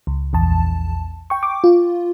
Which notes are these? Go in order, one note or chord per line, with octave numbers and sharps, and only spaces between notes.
C#2
A#1 E2 A5
G5 C#6
D6
F4